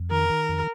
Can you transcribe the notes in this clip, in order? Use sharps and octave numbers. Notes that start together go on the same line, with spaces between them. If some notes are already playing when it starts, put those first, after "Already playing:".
Already playing: F2
D#3 A#4
D#3
F2